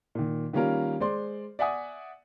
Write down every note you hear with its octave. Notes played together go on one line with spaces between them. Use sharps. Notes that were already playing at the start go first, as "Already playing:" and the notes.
A#2 D#3
D#3 G3 A#3 C#4 F4 A#4
G#3 C5 D5 C6
D5 E5 F#5 G#5 D#6